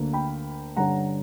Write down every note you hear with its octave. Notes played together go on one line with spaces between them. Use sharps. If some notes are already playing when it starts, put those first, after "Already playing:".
Already playing: D2 D3 A#3
G5 B5
G2 D3 G3 C#4 F#5 A#5